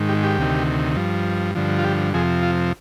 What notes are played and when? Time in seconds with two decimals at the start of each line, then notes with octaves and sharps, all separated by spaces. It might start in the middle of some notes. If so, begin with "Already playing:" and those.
Already playing: G#2 D#3
0.09 G4
0.24 G4
0.38 D2 C3 D#3
0.96 G2 F3
1.55 G2 D3 F3
1.79 F4
1.84 G4
2.14 F2 C3 F3 G#4
2.42 F4